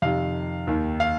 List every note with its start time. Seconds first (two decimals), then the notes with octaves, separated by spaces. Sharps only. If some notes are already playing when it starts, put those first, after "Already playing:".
0.02 F2 C3 D#3 F5
0.67 D#2 D#3
1.00 F5